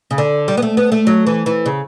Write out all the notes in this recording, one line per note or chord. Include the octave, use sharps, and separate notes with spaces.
C#3
D3
G3
B3
A3
B3
A3
F#3
E3
E3
C#3